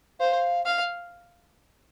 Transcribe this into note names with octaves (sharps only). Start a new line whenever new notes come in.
C5 F5
F5